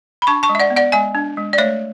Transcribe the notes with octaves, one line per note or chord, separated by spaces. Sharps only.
B5
D4 A5 C#6
A5 C#6
G#3
E5
D5 F#5
B3
D5 F#5
G#3 E5 G#5
D4
G#3
D5
A3 C#5 E5